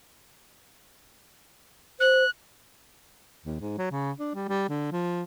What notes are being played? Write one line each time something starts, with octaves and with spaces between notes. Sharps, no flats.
C5 F#6
D#2
G#2
F#3
C#3
D4
G3
G3
D3
F3